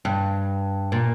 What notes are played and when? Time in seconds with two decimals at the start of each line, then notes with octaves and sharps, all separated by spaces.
0.05 G2
0.92 A#2